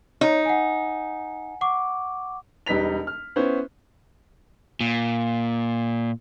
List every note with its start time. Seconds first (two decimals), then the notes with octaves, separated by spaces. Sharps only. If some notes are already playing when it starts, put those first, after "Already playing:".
0.21 D#4 C#5
0.45 F#5 G#5
1.61 F#5 C#6 D6
2.66 E1 G3 D#4 B4 B6 F7
3.07 F6
3.36 B3 C#4 E4 C5
4.81 A#2